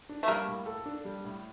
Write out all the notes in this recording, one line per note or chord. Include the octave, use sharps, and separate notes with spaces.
D4
A3
G3 A#3
A2
A4
D4
G3
A2